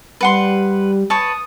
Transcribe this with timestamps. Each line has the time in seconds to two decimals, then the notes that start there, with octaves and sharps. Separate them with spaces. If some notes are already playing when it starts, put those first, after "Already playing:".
0.21 G3 B4 F#5 C6
1.10 B4 C#5 A5 D#6